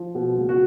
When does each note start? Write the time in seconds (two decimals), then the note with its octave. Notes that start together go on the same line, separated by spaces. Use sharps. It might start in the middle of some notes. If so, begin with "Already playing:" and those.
Already playing: F3
0.15 B2
0.37 C#2
0.49 F#4